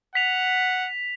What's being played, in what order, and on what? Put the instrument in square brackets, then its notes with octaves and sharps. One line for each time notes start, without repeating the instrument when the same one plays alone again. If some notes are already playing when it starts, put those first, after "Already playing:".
[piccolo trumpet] F#5 [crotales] B6 F7